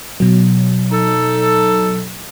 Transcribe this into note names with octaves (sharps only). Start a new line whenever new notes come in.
B2 F#3
D#4 A4